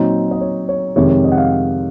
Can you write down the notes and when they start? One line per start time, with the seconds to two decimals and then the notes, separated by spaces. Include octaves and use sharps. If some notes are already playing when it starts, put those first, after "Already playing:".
Already playing: A#2 F#3 C4 D#4
0.31 D#5
0.41 C#5
0.69 C#5
0.96 F2 C3 D#3 G#3 C#5
1.10 C#5
1.24 D#5
1.32 F#5
1.38 F5
1.52 F#5